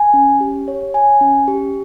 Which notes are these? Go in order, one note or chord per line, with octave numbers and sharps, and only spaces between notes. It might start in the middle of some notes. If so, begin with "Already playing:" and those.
Already playing: G#5
C#4
G4
C#5
G#5
C#4
G4